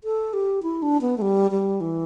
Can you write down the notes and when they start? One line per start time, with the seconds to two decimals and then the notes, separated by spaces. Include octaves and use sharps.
0.04 A4
0.33 G4
0.63 E4
0.82 D4
1.01 B3
1.18 A3
1.22 G3
1.51 G3
1.81 E3